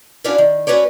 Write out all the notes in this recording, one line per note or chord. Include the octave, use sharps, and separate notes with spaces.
C#4 D4 E4 F#4 D5 F5
D#3
A3 C#4 F#4 B4 C#5 D5